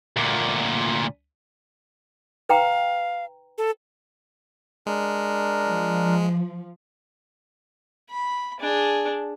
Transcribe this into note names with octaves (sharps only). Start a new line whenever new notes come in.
D2 A#2
B4 F5 G5 A#5
A4
G#3 D4 A#4
F3
B5
D4 G#4